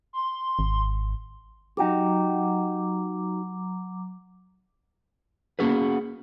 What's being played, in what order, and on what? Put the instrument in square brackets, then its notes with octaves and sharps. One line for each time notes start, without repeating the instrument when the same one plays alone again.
[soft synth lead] C6
[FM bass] G#1
[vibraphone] F#3 A#5 D6 [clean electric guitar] D#4 F#4 G4
[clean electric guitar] A#3 B3 C#4 F#4 G#4 B4